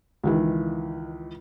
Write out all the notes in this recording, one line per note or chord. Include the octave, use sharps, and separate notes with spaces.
C#2 D#3 E3